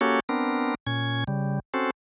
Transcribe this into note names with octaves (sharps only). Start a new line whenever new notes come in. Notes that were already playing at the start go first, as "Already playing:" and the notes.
A#3 C#4 F#4 G4 A4 C#5
B3 C4 D4 A#4
A#2 C#4 G#6
C#3 G3
C4 C#4 F#4 A4 C5